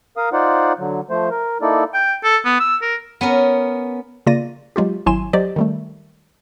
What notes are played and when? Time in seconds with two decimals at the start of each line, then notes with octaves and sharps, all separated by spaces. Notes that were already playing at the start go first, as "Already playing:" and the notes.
0.17 A#4 F5 D#6
0.33 D#4 F4 C5 D5 F#5
0.79 D3 F#3
1.10 F3 A3 C5
1.31 A#4
1.62 A#3 D#4 E4 A4 D5
1.94 G5
2.24 A4
2.45 B3
2.60 E6
2.82 A#4
3.21 B3 C#4 A#4
4.26 C#3 A#3 F4 D5 A#6 D#7
4.76 F#3 G#3 F4 G4
5.06 G#1 F#3 E4 G#5 C6 E7
5.33 F#3 G4 C5 D5 D#5
5.56 D#3 G3 A3